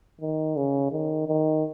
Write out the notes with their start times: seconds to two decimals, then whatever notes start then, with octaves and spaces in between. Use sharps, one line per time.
0.21 D#3
0.56 C#3
0.92 D#3
1.27 D#3